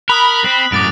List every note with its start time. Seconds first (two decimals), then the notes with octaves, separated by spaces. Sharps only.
0.09 A#4 B5 D#6 F#6
0.44 C4
0.72 F#2 A2 D6 A6 D7